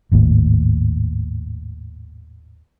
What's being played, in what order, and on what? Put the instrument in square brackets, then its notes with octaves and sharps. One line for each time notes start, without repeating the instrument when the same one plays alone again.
[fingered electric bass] G#1 D#2 A2